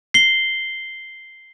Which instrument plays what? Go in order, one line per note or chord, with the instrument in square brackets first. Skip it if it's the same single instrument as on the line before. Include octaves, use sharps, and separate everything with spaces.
[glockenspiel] C7 G7